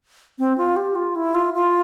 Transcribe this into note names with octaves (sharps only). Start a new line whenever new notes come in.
C4
F4
G4
F4
E4
F4
F4